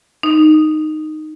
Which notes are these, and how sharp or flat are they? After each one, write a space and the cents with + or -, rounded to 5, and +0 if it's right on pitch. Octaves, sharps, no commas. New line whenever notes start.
D#4 -10